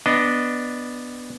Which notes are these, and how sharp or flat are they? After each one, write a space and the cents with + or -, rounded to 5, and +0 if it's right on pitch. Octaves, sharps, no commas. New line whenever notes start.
B3 +0 D4 +0 D#5 +0